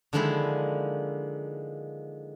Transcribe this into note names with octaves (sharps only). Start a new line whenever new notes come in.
D3 D#3 F3 G#3 A#3 E4